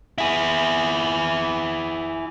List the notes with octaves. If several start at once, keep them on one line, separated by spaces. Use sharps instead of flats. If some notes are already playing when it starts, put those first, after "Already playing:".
E4 G#4